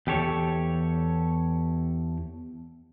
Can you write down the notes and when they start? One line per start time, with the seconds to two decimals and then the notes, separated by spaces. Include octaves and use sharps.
0.07 E2 G4 A4 C#5